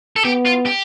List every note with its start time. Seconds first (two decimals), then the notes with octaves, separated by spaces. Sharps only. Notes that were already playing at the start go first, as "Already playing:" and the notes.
0.16 A4
0.25 B3 G4
0.46 F4
0.66 G4